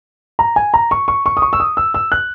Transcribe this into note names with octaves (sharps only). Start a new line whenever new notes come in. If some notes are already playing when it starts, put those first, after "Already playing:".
A#5
G#5
A#5
C#6
C#6
C#6
D#6
C#6
E6
D#6
E6
E6
F#6